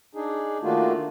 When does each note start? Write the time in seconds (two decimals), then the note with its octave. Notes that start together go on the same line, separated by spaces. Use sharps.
0.15 D4 D#4 G#4
0.63 D#3 A3 A#3 D4 F4 F#4